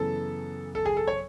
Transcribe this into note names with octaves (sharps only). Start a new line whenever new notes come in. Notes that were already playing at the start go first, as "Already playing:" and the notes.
Already playing: F#2 C#3 E3 B3 A4
A4
G#4
A4
C#5